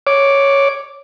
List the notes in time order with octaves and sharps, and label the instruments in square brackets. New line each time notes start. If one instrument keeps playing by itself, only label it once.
[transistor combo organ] C#5 D6